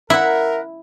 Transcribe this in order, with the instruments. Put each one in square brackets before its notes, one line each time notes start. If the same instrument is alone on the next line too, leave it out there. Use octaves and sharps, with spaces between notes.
[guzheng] E4 [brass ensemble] A#4 [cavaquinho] E5 F#5